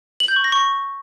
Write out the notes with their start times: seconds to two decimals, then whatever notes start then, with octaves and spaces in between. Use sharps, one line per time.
0.20 F#7
0.28 G6
0.36 C#6
0.44 A#6
0.52 C#6